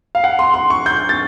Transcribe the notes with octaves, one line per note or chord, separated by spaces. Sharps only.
F5
F#5
C6
C6
C#6
G6
A6